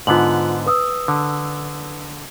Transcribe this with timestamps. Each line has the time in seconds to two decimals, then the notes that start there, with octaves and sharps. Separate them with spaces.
0.07 G#2 D3 B3 F4 F#7
0.66 B4 D#6 E6
1.08 D3